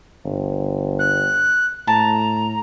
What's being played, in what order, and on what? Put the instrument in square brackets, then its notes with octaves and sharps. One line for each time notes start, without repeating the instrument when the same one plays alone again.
[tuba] G1
[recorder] F#6
[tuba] A2 [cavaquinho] A5 [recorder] A#5